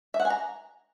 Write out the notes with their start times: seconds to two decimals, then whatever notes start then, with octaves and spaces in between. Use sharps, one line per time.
0.14 E5
0.20 F#5
0.25 G#5
0.30 A#5